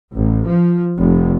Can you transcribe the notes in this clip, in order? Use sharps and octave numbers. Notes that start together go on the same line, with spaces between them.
A1
F3
F1